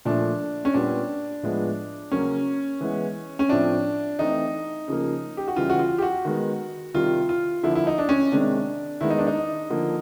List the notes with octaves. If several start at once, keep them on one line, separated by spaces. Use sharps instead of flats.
A#2 F3 A3 D4
C#4
A#2 G3 B3 D4
A2 F3 G#3 B3
C#3 F#3 A#3 C#4
E3 G#3 B3
C#4
A2 F3 A3 C4 D4
E3 A3 C4 D#4
C#3 F3 A#3
G4
F#4
C#3 E3 G3 F4
F#4
F4
G4
F#4
D#3 G#3 B3
C3 D#3 G3 F4
F4
D3 F3 A#3 E4
E4
D#4
D4
C#4
C3 D#3 G#3 C4 D4
D#3 G#3 B3 E4
D#4
D4
D#4
D3 F3 A#3